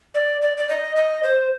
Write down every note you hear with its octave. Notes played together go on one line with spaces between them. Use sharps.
D5
D5
D5
D#5
D#5
C5